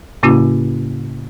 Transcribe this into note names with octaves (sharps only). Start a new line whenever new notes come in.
A2 C#3 A#3 C#4 E4 F#4